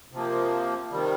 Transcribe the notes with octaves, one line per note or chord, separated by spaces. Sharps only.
C3 F3 A#3
C3 D#3 G3